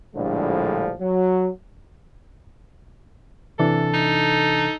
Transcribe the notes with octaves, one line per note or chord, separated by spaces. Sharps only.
A#1 A2 D3 F3 G3 G#3
F#3
C3 E3 D4 A4
D#4